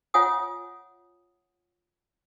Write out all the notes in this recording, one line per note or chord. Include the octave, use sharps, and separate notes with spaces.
F4 C#5 E5 F#5 G#5 D#6